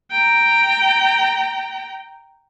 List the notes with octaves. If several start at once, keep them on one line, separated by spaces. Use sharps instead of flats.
G5 A#5